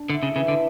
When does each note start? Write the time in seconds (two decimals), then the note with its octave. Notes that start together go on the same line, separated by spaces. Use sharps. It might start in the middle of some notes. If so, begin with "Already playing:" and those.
Already playing: D4
0.10 D3 E4
0.23 C#3
0.35 C#3 E3
0.48 D3